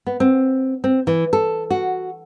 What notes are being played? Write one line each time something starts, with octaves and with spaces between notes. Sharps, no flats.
B3
C4
C4
E3
A4
F#4